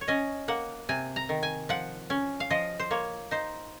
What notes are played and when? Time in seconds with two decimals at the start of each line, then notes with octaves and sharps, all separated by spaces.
0.01 C#5
0.08 C#4 D#5
0.48 A#3 F#5
0.89 C3 G#5
1.16 A#5
1.29 D#3
1.43 G#5
1.69 F3 F#5
2.10 C#4
2.40 F5
2.50 F3 D#5
2.79 C5
2.91 A#3 C#5
3.31 D#4 C5